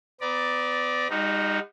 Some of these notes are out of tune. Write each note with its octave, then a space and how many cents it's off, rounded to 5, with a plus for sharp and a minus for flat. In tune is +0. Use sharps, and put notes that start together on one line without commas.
B3 +35 D5 +0 A#5 +40
G3 +45 D#4 +0 F#4 +0